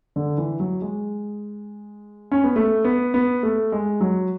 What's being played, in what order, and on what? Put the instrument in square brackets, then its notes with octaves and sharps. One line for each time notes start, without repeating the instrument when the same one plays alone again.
[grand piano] D3
E3
F#3
G#3
C#4
B3
A3
B3
B3
A3
G#3
F#3